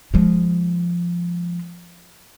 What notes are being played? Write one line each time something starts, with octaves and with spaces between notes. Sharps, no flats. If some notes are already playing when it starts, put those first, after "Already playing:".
F3 G#3